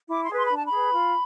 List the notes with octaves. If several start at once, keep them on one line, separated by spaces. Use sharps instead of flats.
E4 D6
C6
G#4 B4
C6
B5
D4
A5
B5
G#4 B4
F4